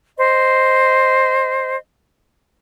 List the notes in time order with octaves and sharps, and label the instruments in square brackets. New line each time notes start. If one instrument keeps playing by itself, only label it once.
[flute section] C5 D#5